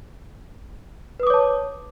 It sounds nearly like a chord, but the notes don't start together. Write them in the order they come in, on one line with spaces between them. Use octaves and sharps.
B4 D#6 D6 C#5 A5